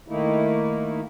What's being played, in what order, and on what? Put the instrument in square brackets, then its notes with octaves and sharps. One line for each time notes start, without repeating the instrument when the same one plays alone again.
[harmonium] D#3 A3 A#3 D#4 E4